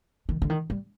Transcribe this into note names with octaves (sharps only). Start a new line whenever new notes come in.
D#3
D3
D#3
G3